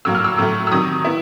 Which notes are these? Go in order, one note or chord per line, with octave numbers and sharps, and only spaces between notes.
A2 F#3 A#3 E6
F6
E6
A2 F#3 A3
E6
C3 D#3 F#3 D#6
B3 E4